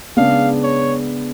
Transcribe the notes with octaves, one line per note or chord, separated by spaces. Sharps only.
C#3 G#3 B3 D4 F5
C#5